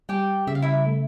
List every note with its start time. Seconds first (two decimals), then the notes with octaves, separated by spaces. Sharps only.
0.09 G3 G4 G5
0.47 C#3 E5
0.55 F5
0.62 E4 E5
0.86 A3